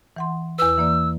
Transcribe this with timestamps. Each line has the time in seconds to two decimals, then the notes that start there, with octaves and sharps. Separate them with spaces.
0.16 E3 F#5 C6
0.59 E2 B4 E6
0.78 E3 A#3 D5